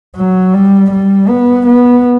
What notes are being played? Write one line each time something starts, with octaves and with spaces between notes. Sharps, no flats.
F#3
G3
G3
B3
B3